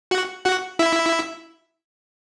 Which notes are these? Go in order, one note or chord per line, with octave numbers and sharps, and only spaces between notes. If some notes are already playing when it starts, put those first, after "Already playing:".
F#4 F#5
F#4 F#5
E4 E5